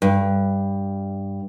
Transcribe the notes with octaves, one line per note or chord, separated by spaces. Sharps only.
G2